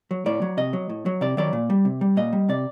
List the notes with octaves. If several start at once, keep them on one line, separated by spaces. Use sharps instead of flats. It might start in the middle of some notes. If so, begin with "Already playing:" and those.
F#3
A2 D5
F#3
C3 D#5
F#3
A2
F#3
C3 D5
D#3 F#3 D5
A#2
G3
C3
G3
A#2 D#5
G3
C3 D5